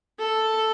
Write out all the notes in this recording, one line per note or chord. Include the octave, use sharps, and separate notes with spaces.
A4